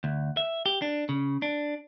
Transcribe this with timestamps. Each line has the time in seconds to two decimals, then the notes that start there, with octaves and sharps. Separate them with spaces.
0.04 D2
0.37 E5
0.66 G4
0.82 D4
1.09 C#3
1.42 D4